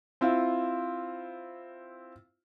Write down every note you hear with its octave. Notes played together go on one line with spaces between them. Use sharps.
C4 E4 F4